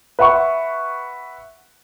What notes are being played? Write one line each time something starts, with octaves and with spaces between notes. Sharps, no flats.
B4 E5 F#5 B5 C#6